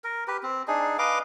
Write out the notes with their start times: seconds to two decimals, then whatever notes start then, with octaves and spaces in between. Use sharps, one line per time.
0.04 A#4
0.28 G4 B4
0.43 C4
0.68 D4 D#4 G#4
0.98 B4 D#5 F5 D6